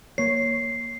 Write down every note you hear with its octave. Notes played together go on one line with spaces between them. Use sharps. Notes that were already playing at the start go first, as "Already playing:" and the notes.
A#3 C#5 C7